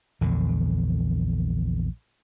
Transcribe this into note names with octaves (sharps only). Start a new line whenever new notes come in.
A#1 E2 D3